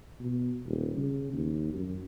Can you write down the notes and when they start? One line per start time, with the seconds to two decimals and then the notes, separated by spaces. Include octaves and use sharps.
0.20 B2
0.65 D#1
0.97 C#3
1.33 D#2
1.74 F#2